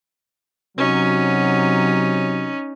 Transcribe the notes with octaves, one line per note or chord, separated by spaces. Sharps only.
C3 F#3 C#4 D#4